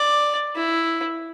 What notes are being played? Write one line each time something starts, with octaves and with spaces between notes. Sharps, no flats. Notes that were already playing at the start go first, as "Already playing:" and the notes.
Already playing: D5
E4